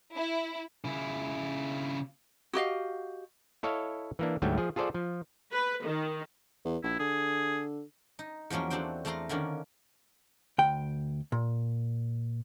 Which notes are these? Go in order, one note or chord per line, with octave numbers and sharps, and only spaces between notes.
E4
C#3 E4
F#4 G4 D#5 F5
E4 A4 C#5 D#5 F5
E3 A#3 D4
D2 G#2 F#3 G3 A3 G5
F3 G#4
F4 G#4 A4 C5 D5
F3
B4
D#3
E2
A#1 E4
D3 G#4
D#4
E2 F3 F#3 A#3 C#4
A3 C4 D4 F#4 C5 G5
E2 A3 D5 F5 A#5 C6
D3 D#3 A#3 C#4 D4
D2 G5
A#2